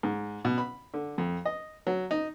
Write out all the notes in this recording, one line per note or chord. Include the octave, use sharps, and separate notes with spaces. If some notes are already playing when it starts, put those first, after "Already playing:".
G#2
B2
B5
D3
F2
D#5
F#3
D#4